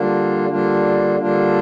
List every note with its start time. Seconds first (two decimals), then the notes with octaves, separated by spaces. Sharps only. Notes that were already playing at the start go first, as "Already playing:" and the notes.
Already playing: D3 G3 A#3 D4 F4
0.49 D3 G3 A#3 D4 F4
1.19 D3 G3 A#3 D4 F4